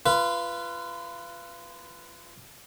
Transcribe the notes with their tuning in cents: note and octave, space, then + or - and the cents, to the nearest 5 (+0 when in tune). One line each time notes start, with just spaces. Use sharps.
F4 -30 B4 +0